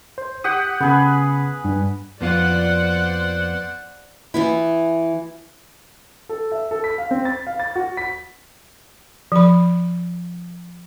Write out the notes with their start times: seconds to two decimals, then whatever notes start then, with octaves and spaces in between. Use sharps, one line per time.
0.18 C5
0.44 G4 F#5 D#6
0.81 C#3 B3 G#4 B4
1.65 G2
2.21 F2 B3 F4 C5 D5 F#5
4.34 E3 B3 E4
6.29 A4
6.52 E5
6.71 A4
6.84 B6
6.98 F5
7.11 C4
7.25 A6
7.47 F5
7.60 A6
7.76 F#4
7.97 B6
9.32 F3 B5